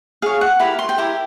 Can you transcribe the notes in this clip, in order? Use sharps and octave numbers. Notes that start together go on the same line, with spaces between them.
G#4 C#5 F5
F#5
E4 G4 A#4 B5
C6
G5
E4 G4 A#4